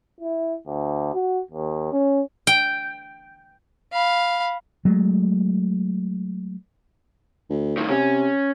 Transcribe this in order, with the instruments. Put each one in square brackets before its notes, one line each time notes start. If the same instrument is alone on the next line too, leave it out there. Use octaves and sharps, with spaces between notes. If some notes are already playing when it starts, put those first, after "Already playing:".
[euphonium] E4
D2
F#4
D#2
C#4
[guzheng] G5
[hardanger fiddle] F5 B5
[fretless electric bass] F#3 G#3 A3
[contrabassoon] D2
[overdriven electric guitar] A2 D#3
[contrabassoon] C3 [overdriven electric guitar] C#4